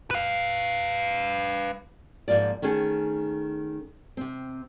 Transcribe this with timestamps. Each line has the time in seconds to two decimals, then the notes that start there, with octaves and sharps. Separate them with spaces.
0.11 B4 F5
2.28 G#2 F3 A#3 F4 D5
2.62 D#3 A3 C#4 G#4
4.17 C3 C4